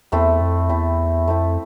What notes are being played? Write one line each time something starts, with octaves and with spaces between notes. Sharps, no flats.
E2 A3 C4 E4
F2
E2 A3 C4 E4
F2 A3 C4 E4